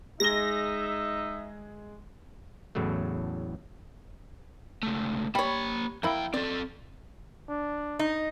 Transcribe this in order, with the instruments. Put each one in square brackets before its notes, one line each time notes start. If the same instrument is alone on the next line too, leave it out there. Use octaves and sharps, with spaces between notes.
[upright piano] G#3 G#4 G7 [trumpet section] D#4 E5 [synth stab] A#6
[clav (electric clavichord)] E2 A2 C#3 F#3 A3
[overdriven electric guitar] C#2 A3
[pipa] G3 C#5 [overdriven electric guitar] A#3 B5
[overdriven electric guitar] F2 G5 [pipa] A#3 E4
[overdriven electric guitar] C4 A4 [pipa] D5
[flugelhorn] D4
[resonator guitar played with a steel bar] D#4